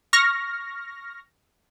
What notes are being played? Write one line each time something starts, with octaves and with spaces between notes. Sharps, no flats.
C#6 F6 A#6